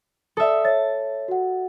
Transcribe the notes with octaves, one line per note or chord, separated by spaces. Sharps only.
A4 D5 E5 D#6
C#5 E5 A6
F#4 F#5